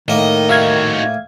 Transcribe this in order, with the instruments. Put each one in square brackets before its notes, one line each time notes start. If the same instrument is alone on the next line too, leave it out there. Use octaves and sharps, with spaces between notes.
[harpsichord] A2 A#3 [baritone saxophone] D#3 [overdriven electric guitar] D#5
[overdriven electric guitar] D#4 F#4 [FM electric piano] E5 F5 G#6